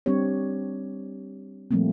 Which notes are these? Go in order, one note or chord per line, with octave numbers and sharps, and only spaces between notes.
G3 C4 D4 G4 C#5
A#2 F3 G3 A3 A#3 C4